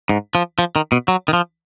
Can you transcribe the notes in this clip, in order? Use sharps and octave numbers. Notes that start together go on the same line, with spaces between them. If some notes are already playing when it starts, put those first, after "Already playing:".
G#2
F3
F3
D#3
B2
F#3
D#3
F3